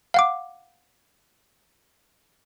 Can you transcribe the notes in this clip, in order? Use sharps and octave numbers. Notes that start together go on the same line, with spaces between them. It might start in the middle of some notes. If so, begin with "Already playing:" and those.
F5 F#5 D6